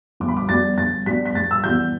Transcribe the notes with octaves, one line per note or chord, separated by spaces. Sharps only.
G1 D6
B5
D6
G2 G3 B3 D4 A6
G1 A6
G2 G3 B3 D4 B6
B6
G2 A6
E6
E3 G3 B3 G6